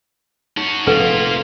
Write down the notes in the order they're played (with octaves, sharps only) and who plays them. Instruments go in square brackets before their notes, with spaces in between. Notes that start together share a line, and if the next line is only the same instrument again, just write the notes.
[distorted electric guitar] C#4 F#4 [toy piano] D#4
[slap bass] F1 A#2 [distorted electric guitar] A#3 F4 [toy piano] A4 B4 F#5